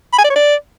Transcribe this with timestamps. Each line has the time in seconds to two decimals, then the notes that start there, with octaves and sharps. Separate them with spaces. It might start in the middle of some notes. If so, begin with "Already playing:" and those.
0.13 B5
0.18 G#5
0.24 D5
0.30 C#5
0.36 D5